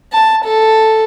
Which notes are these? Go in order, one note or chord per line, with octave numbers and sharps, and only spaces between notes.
A5
A4